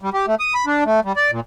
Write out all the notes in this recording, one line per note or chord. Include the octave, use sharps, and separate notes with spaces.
G3
G4
A3
D#6
B5
D4
A3
G3
D5
A#2